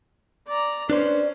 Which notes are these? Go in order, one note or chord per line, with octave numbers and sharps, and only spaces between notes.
D5 A#5
C#4 D4 B4 C5 D5